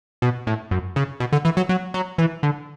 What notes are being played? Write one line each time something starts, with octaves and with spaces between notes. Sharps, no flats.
B2
A2
F#2
C#3
B2
D3
E3
F#3
F#3
F#3
E3
D3